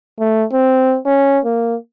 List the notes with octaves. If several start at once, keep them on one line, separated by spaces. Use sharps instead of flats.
A3
C4
C#4
A#3